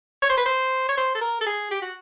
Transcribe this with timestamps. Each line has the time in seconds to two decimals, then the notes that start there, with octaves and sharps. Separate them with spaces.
0.22 C#5
0.29 C5
0.37 B4
0.46 C5
0.89 C#5
0.97 C5
1.15 A4
1.21 A#4
1.41 A4
1.46 G#4
1.71 G4
1.82 F#4